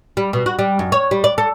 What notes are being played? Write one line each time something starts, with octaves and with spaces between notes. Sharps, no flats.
G3
B2
F#4
G3
F#2
C#5
G3
D5
A4